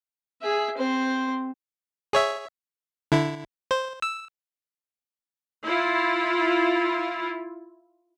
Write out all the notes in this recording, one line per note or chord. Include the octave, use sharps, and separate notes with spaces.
G#4 E5
C4 C5
G#4 C#5 E5
D3 E4
C5
E6
E4 F4